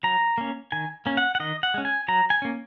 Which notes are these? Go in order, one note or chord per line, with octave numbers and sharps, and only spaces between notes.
F#3 A#5
A#3 C#4
D#3 G#5
A#3 C#4
F#5
F#5
D#3 D#5
F#5
G#3 C#4
G#5
F#3 A#5
G#5
A#3 C#4